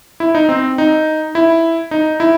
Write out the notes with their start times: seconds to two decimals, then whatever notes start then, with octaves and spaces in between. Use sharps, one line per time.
0.20 E4
0.35 D#4
0.49 C4
0.78 D#4
1.35 E4
1.91 D#4
2.20 E4